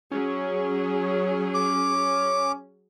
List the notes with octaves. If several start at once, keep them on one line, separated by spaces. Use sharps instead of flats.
F#3 C#4 G#4
D6